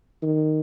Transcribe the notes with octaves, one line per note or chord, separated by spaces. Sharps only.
D#3